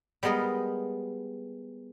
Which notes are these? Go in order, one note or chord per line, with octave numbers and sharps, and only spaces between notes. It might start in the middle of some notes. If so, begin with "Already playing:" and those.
G3 G#3 B3 A#4 D#5